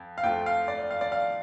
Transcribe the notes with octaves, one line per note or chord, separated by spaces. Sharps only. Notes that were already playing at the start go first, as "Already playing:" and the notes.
Already playing: F2
F5
F2 F3 A3 F4 G5
F5
D5
F5
D5
F5